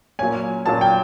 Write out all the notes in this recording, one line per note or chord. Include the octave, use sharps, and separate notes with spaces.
A#2 F#3 A#3 C#4 G#5
A#2 F#3 A#3 C#4 A5
G5